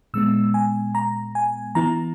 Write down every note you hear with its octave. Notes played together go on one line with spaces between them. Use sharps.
A#2 G#3 B3 E6
G#5
A#5
G#5
E3 B3 E4 A#5